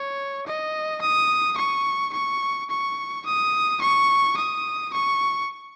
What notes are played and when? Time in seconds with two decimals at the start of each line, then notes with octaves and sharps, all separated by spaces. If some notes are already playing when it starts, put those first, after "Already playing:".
Already playing: C#5
0.47 D#5
1.02 D#6
1.57 C#6
2.13 C#6
2.70 C#6
3.26 D#6
3.81 C#6
4.37 D#6
4.93 C#6